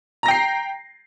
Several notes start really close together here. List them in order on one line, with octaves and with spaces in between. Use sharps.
A#5 A#6 G5 C7